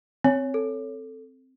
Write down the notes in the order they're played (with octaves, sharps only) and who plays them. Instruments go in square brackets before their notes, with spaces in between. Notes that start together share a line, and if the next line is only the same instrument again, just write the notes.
[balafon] C4 [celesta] C#5
[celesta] A4